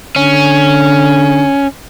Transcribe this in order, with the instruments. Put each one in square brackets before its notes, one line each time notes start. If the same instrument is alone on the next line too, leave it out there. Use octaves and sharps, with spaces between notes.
[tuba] D3 [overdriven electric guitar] C#4